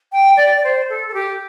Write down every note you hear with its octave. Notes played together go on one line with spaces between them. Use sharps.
G5
D5
D5
C5
A4
A4
G4